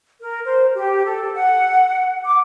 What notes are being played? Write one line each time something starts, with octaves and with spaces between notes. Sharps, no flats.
A#4
C5
G4
A4
F#5
D6